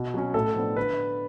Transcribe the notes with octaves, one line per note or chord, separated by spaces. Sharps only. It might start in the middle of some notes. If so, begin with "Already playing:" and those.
Already playing: B2
F#3 C#4
A2 A4
F3 B3 D4
D3 B4